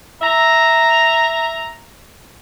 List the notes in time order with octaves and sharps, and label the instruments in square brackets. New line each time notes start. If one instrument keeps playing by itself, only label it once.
[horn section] E5 A#5